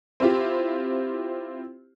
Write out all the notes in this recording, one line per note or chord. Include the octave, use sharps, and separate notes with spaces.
C4 E4 F4 G4